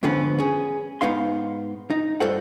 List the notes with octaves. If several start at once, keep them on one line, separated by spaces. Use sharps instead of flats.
F2 G#2 D3 B3 C#4 B4
C#4 G#4
G#2 B3 D#4 F5 C6
D#4
G2 F4 A4 C5 F#5